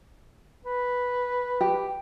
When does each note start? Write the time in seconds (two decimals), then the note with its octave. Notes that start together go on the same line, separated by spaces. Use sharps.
0.65 B4
1.61 G4